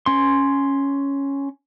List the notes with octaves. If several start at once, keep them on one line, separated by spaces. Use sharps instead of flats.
C#4 C6